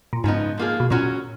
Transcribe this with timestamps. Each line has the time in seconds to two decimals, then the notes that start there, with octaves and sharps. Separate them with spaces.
0.13 A#2
0.24 G#2 C#3 F3 B3 D#4
0.58 F3 A#3 F4 G#4
0.80 B2
0.90 A#2 F#3 C#4 F#4